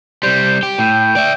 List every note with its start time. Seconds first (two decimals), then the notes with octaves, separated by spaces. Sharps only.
0.23 C2 G3 C5
0.63 G4
0.79 A2 G5
1.16 D5 E5